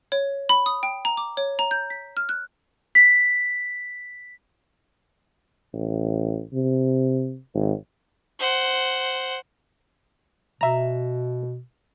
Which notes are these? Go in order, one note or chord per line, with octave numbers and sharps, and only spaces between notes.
C#5
B5
D#6
G5
A#5
D6
C#5
A#5
G6
B6
F6
F#6
B6
A1
C3
G#1
C5 F#5
B2 E5 A#5